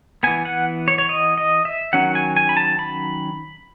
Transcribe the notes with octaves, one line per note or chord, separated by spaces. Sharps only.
E3 B3 G#5
F#5
C#5
C#5
D#5
D#5
E5
D#3 F#3 C#4 F#5
G#5
G#5
B5
A5
B5